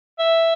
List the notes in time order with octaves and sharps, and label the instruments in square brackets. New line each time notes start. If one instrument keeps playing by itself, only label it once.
[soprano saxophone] E5